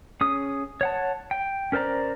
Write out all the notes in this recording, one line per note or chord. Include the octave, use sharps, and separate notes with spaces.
C#4 G#4 D#6
C#5 F#5 A5
G5
C#4 A#4 C5 D5 A#5